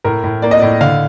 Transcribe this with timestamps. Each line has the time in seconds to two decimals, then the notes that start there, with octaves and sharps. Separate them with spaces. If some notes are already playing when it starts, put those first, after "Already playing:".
0.04 A2 A#4
0.24 A2
0.42 A#3 D5
0.51 D#5
0.59 D5
0.62 A2
0.81 D3 F5